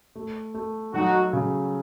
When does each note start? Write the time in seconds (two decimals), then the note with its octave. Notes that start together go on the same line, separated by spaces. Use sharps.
0.16 A3
0.54 A3
0.93 F#3 D#4 F#4
1.33 C#3